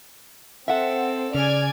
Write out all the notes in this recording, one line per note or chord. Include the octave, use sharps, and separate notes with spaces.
C4 A4 E5 F#5
C#3 D5 G#5 F6 G#6